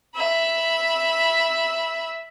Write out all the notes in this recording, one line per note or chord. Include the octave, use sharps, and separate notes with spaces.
E5 B5